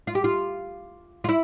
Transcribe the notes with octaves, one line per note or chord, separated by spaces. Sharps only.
F4
G4
F4
F4
E4